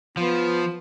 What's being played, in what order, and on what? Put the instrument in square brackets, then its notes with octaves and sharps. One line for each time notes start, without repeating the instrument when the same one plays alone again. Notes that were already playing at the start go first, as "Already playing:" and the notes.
[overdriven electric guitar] F3 [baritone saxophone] B3 [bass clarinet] F4